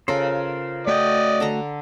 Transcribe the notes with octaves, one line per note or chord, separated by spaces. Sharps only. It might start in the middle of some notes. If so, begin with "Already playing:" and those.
C#3 F4 A4 A#4 C5
A3 F#4 D5 D#5 G5
D3 A4 A#5